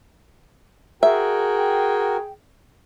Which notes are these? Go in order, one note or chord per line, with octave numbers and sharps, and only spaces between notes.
F#4 G#4 A#4 E5 G5